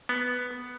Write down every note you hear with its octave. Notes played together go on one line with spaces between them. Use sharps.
B3